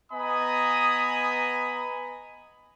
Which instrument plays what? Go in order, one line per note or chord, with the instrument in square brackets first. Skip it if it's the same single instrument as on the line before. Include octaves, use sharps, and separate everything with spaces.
[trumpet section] B3 D#5 G#5 A#5 B5 D#6